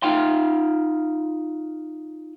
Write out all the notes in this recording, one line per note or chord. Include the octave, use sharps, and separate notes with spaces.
D#4 F4 F5 G5 C6